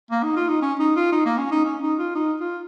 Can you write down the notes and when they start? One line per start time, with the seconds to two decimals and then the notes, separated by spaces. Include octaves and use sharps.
0.11 A#3
0.23 D#4
0.36 F4
0.49 D#4
0.62 C#4
0.79 D#4
0.96 F4
1.12 D#4
1.26 A#3
1.38 C#4
1.51 D#4
1.65 C#4
1.82 D#4
1.99 F4
2.15 D#4
2.41 F4